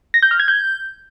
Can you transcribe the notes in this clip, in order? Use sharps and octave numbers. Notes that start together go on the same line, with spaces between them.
A#6
G6
F6
G#6
G6